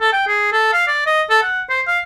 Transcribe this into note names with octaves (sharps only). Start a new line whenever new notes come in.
A4
G5
G#4
A4
F5
D5
D#5
A4
F#5
C5
F5